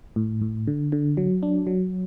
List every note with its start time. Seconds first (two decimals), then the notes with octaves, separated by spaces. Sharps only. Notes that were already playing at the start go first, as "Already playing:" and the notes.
0.16 A2
0.41 A2
0.67 D3
0.92 D3
1.17 F#3
1.43 D4
1.67 F#3